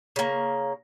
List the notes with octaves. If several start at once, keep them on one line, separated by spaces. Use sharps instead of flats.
C#3 A#3